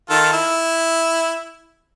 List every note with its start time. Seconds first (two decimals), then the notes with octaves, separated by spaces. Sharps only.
0.10 D#3 F4 A4
0.33 E4